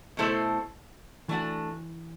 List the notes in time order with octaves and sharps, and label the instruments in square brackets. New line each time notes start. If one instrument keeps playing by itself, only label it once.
[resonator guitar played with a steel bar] B2 A3 E4 A4 C5
[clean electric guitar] E3 [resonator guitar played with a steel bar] A3 D4 F#4